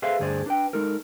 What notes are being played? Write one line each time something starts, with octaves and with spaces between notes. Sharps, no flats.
G#4 A4 B4 C5 E5 F5
D2 G2 D3 G#4 C5 D5
D4 B4 G5
G#3 D#4 A4 A#4